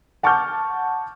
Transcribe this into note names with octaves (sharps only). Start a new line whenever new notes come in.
F#5 A5 C#6 D6 F6 G6